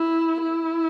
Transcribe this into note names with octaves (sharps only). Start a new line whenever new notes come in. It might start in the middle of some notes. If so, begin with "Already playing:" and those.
Already playing: E4
E4